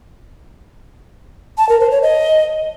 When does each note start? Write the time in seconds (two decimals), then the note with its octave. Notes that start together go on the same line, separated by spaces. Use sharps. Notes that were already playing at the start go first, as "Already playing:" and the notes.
1.58 A5
1.69 A#4
1.80 C5
1.91 C#5
2.02 D#5